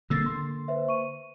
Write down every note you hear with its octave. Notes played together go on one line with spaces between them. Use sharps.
D3 A#3 E6 A6 C7
C6
B4 C5 E5
C#6 D#7